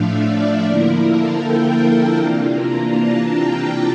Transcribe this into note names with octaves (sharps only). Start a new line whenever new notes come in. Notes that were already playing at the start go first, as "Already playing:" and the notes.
Already playing: A2 F3 A3 D4 E5 F5
D5
D3 F3 A#3 E4 A#4
A4
G5
C3 E3 A#3 D4 F4
A#5
A5
G5